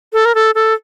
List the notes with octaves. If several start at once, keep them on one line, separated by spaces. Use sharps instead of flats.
A4
A#4
A4
A4